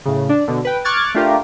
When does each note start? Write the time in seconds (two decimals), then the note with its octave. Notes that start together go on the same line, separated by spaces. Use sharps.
0.05 A2 C#3
0.29 D4
0.48 B2 D3
0.65 B4 G5
0.85 C#6 D6 F6 F#6 G#6 A6
1.14 A3 D4 F4 G4 A#4